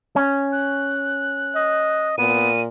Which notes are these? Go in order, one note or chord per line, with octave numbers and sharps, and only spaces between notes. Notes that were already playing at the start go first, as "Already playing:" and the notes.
C#4
F#6
D#5
A#2 B3 D#7